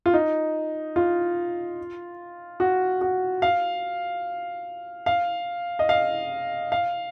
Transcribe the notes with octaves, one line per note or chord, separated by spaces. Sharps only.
F4
D#4
F4
F#4
F#4
F5
F5
D#5
F5
F5